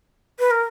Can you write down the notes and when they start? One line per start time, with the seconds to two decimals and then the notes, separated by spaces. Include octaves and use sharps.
0.39 B4
0.51 A#4